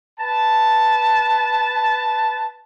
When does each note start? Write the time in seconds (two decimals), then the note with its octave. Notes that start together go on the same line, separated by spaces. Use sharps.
0.20 B4 A5